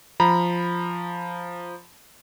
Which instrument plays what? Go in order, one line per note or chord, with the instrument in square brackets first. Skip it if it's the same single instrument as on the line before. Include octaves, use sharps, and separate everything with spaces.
[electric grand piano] F3 A#5 B5